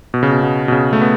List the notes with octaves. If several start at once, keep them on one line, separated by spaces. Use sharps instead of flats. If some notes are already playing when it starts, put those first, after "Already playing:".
B2
C#3
B2
B2
B2
C#3
A3
B3